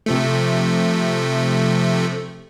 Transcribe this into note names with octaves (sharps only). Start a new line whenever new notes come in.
C3 F3 A3